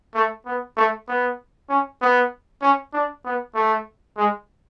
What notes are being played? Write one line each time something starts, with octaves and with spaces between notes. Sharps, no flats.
A3
B3
A3
B3
C#4
B3
C#4
D4
B3
A3
G#3